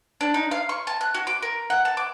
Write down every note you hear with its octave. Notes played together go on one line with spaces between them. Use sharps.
D4
D#4
F5
C#6
A5
F#6
F#4
D6
A#4
F#5
A5
D6